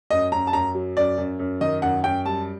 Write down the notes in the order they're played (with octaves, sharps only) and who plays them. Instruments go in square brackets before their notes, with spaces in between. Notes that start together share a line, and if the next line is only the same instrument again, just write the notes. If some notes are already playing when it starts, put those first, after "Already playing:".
[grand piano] F#2 D#5
F#2 A#5
A5
F#2 A#5
F#3
F#2 D5
F#2
F#2
D#3 D#5
F#2 F#5
F#2 G5
G3 A5